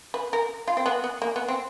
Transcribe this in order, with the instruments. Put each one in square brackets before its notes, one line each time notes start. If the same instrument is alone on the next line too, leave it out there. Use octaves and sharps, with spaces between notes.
[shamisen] B4
A#4
F4
C4
B3
B3
A#3
B3
C4